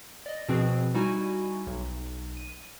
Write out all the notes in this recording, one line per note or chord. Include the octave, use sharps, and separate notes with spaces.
D5 D#5
B2 F3 C4 G#4 B4
G3 D#4 E4 F#4 G#5
B1
D#7